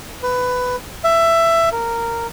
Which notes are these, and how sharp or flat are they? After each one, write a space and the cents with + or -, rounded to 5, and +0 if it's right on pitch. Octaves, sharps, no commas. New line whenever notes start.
B4 +15
E5 +15
A#4 -10